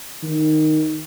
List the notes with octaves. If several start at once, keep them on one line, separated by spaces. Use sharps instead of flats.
D#3